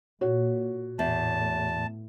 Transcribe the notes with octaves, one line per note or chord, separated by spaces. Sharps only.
A#2 F#4 C#5
E2 A2 A5